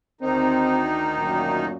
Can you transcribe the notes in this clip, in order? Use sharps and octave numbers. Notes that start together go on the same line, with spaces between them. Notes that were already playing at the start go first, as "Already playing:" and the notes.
D2 D#3 C4 D#4
F#2 A#2